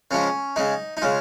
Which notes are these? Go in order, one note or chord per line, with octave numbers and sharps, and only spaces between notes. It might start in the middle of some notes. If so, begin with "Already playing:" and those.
C#3 F3 G#3 C#4
C#3 G#3 D#4
D#4
C#3 G#3 F4